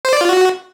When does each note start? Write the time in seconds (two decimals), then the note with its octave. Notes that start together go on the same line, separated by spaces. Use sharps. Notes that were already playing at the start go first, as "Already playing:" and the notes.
0.05 C5
0.13 D5
0.21 F4
0.29 F#4